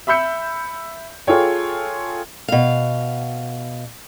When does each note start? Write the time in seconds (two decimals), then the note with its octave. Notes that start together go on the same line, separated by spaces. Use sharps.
0.07 E5 B5 E6 G6 C#7
1.27 F4 G#4 A4 C#5 G5
2.48 B2 F5